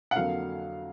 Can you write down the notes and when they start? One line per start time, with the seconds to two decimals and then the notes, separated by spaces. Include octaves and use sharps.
0.11 F#5
0.16 F2 D3 F#3 A#3 F5